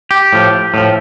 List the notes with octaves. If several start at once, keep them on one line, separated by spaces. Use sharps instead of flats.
G4
A2 F3
A2 F3